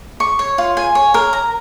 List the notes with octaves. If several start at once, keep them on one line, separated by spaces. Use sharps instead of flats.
C#6
C#5
F4
G#5
C#5
A#4
A#5